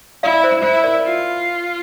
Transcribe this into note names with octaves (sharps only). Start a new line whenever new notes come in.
E4 D5 F5
C5 E5
E4 C5
A#4 D5
F4